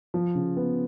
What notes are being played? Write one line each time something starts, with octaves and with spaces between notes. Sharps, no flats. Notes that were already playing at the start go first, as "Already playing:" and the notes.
F3
C#3
B3